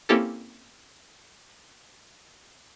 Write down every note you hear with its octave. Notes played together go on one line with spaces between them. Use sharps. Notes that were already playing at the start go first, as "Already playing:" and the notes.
A#3 C4 C#4 E4 G4 A4